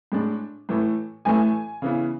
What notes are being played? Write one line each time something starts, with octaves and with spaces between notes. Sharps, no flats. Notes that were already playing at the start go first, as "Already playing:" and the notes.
A2 G#3 D4
A2 E3 A3
A2 E3 A3 G#5
C#3 E3 B3